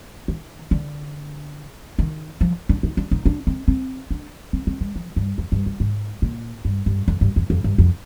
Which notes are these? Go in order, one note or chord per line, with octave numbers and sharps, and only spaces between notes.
D#3
D3
D#3
F3
D4
D#4
D4
D#4
D4
C4
C4
D4
C4
C4
G#3
F3
G2
F2
G2
G2
G#2
A#2
G2
G2
F2
G2
F2
F2
G2
F2